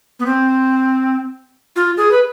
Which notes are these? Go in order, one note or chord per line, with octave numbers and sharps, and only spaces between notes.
B3
C4
F4
G#4
B4